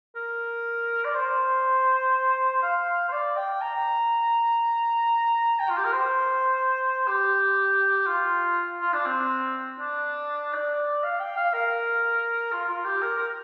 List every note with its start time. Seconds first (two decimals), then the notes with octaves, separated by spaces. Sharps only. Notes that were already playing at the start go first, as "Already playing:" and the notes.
0.16 A#4
1.05 D5
1.14 C5
2.63 F5
3.08 C5
3.12 D5
3.37 G5
3.62 A#5
5.60 G5
5.69 F4
5.77 G4
5.85 A#4
5.93 C5
7.07 G4
8.07 F4
8.81 F4
8.93 D4
9.06 C4
9.80 D4
10.55 D5
11.04 F5
11.20 G5
11.37 F5
11.53 A#4
12.52 F4
12.69 F4
12.85 G4
13.02 A#4
13.18 A#4